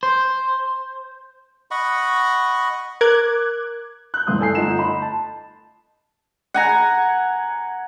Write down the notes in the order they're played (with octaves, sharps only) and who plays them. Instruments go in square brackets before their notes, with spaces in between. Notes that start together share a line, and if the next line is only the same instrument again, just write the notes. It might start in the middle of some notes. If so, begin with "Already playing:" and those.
[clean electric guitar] C5
[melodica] D#5 F#5 B5 C#6
[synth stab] A#4 D6 F#6 G#6
[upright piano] F#6 G6
E1 C2 G2 E4 C6 D#6
A4 G#5 C7
G1 A3 D#4 F4 F#5 E7
D#5 B5 C6
A5
[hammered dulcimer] F#5 G#5 A#5